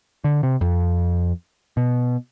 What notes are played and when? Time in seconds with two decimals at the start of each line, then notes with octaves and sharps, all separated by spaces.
0.24 D3
0.43 C3
0.61 F2
1.77 B2